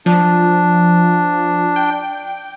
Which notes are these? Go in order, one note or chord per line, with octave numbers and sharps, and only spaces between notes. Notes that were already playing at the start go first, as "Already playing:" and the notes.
F3 D4
G5